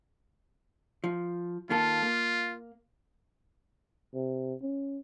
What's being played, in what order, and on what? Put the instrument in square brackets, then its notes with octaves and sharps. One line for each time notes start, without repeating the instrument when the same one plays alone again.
[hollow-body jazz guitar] F3
[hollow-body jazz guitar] D#3 A#3 A4 [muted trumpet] F4
[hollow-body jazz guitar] A#3
[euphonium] C3
C#4